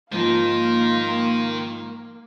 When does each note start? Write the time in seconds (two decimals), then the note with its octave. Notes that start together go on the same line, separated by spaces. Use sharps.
0.12 G#2 D#3 F3 A#3 D#4 F5 C6